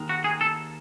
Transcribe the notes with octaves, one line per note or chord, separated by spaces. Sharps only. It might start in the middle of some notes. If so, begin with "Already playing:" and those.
Already playing: D#2 D#3 G#3
F#4
G#4
A4